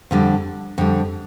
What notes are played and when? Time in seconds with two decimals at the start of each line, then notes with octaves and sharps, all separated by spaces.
0.11 F2 D3 G3
0.78 F2 D3 G3